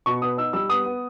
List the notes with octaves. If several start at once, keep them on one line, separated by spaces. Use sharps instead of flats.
B2 C#6
B3 D#6
D#4 E6
G3 E6
B3 D#6
B3